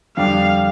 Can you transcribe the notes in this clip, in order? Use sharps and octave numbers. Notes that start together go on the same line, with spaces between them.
F2 D3 G3 D4 G4 F5